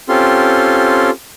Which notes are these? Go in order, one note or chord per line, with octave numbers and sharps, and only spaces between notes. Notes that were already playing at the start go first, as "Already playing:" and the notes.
C4 C#4 F4 G4 A4 C6